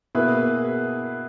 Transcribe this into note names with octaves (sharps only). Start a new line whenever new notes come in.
B2 A#3 E4 G#4 B4